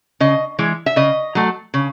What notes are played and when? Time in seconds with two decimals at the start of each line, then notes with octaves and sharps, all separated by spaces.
0.20 C#3 D#5
0.59 E3 G#3
0.86 E5
0.96 C#3 D#5
1.35 F#3 A3
1.74 C#3